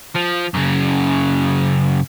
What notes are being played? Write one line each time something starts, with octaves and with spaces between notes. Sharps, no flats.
F3
F#2 C#3